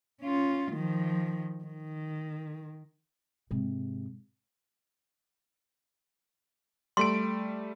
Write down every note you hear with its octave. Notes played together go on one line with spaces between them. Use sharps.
C#4 F4
D#3 F3
D#3
G#2 C3
G3 A3 C6 D7